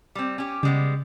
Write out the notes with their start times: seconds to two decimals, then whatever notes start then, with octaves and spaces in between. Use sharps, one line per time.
0.15 G3 C4
0.38 C#4 G4
0.63 C#3 G3 G#3 B3